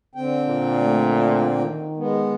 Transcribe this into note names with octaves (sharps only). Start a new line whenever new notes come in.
D3 C4 G5
A#2
A3
D#3
G#3 B3